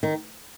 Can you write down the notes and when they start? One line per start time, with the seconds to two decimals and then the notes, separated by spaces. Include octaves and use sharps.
0.03 D#3